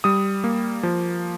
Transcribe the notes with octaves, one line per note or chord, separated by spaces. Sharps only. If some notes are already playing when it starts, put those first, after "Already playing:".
G3 D#6
A#3
F3